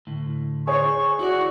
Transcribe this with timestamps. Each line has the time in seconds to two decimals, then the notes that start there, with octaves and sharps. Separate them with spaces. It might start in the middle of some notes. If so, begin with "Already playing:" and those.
0.07 D2 A2
0.67 G#4 C5 C#5 C#6
1.19 E4 F#4 D5